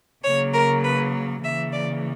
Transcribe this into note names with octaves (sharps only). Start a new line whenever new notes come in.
C#3 F#3 A#3 C#5
A#4
B4
C#3 E3 A#3 E5
D5